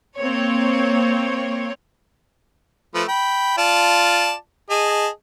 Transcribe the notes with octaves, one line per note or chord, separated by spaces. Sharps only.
A#3 C4 C#5
F3 A3 B4
G5 B5
F4 D5 A5
G#4 D#5 A5